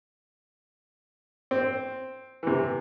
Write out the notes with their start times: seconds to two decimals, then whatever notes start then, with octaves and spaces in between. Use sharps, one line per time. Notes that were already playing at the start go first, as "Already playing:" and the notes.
1.51 C4
2.43 C3 E3